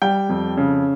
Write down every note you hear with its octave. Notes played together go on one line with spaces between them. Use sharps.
G3 G5
F2
C#3